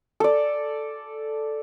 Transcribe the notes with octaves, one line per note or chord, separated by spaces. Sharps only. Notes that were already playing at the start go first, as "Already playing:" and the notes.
A4 D5